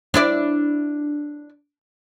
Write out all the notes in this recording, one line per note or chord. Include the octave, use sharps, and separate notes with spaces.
D4 E4 D5